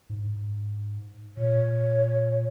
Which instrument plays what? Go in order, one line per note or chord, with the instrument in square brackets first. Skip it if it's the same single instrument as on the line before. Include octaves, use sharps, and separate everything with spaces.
[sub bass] G#2
[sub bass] A#2 [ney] C#5